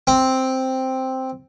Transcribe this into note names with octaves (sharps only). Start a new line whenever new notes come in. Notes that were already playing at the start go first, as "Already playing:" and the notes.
C4